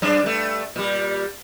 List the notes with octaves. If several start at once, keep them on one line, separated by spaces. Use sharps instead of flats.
F#2 D4
G2 A3
A#2 G3